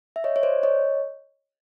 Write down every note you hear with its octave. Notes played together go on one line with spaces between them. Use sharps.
E5
C#5 D#5
C#5
C5 D5
C#5 D#5